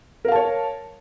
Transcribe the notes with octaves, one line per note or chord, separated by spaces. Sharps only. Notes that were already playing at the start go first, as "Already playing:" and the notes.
A#4 C#5 F5 A5